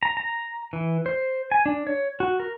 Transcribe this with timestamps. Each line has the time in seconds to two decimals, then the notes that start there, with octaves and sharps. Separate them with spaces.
0.03 A#5
0.17 A#5
0.73 E3
1.06 C5
1.52 G#5
1.66 D4
1.87 C#5
2.20 F#4
2.40 A#4